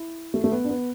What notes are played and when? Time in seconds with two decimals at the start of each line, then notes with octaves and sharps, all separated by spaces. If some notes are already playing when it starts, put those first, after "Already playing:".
Already playing: E4
0.34 A3
0.44 A3
0.52 B3
0.64 D4
0.69 B3